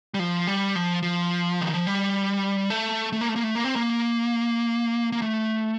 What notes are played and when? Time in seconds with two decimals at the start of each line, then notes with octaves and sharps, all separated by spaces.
0.14 G3
0.19 F3
0.47 G3
0.76 F3
1.03 F3
1.61 D#3
1.74 F3
1.87 G3
2.70 A3
3.12 A3
3.21 A#3
3.29 A3
3.36 A#3
3.44 A3
3.55 A#3
3.64 C4
3.76 A#3
5.12 A#3
5.22 A3